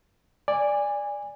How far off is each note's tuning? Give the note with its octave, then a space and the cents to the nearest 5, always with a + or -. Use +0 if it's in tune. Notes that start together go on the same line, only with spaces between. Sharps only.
D5 +0 G#5 -20